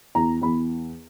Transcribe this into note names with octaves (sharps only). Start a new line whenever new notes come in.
E2 A#5
E2 B5